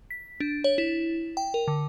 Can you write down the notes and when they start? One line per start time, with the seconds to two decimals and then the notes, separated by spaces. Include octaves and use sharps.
0.11 B6
0.40 D4
0.64 C#5
0.78 E4
1.37 G5
1.54 A#4
1.68 D3